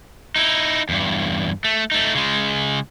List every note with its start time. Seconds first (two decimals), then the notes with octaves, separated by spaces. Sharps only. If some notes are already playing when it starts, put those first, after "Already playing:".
0.36 D#4 E4
0.89 E2 G2
1.65 A3
1.92 A3 D#4
2.15 C#3 G#3